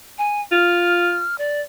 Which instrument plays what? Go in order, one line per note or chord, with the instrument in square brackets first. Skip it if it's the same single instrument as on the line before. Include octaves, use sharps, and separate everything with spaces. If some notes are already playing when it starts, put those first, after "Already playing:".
[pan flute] G#5
[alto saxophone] F4 [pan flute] F6
[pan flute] D5